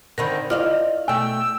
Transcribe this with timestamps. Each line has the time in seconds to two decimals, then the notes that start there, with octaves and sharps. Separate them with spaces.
0.18 D3 D#3 C4 A#4 B5 G6
0.50 E4 F4 D5 D#5 F5 F6
1.08 B2 A3 G5 E6